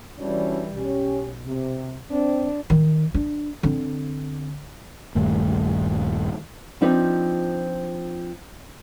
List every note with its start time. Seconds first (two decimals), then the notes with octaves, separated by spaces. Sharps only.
0.19 E3 G3 C#4 D4 F#4
0.77 B1 C#4 G4
1.46 C3
2.11 C4 D4
2.70 D#3
3.14 D4
3.63 D3 C4
5.15 D#1 G2 D#3 A3
6.81 F3 C4 D4 D#4 F4 B4